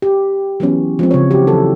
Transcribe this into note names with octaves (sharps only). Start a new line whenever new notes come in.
G4
E3 F#3 B3 C#4
F3 G#3 C4
C#3 C#5
E4 F#4 G4
E3 F#3 A4